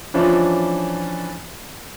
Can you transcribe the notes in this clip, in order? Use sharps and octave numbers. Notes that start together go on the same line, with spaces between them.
E3 F3 C#4 D4